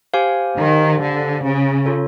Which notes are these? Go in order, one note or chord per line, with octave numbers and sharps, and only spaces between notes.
G4 C5 F5 G#5
D#3
D3
C#3
F4 A4 C#5